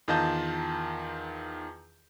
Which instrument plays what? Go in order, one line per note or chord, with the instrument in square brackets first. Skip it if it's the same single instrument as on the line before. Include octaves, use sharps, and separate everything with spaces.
[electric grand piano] E2 D#3 F4 D#5 A5 G6